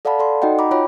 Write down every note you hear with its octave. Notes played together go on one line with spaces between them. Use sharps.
A4 D5 F5 F#5 A5 B5
A4 D5 C6
D#4 F#4 D#5 F#5 G5
A#5 B5 D6
F4 C#5 G5 B5